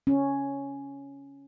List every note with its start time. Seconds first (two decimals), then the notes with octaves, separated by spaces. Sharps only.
0.07 C#4